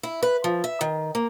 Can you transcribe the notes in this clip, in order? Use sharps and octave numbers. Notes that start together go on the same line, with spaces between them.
E4
B4
F3
E5
D#3
A#3